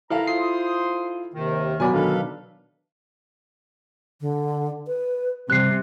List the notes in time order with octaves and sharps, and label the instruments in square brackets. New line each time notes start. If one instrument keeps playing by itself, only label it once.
[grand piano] E4 A4 F5 [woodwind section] B4 A#5
[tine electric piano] F4 C7 [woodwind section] C5 C6 D#6
[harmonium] D#2 C3 [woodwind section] D#3
[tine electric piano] B2 F#3 D5 [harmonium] B3 [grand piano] G#5 B5
[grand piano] D3 D#3 [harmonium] A4 B4 F5
[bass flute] D3
B4
[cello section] C3 [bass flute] G3 [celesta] F#6 C7